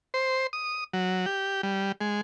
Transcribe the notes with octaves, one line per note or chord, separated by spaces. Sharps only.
C5
D#6
F#3
G4
G3
G#3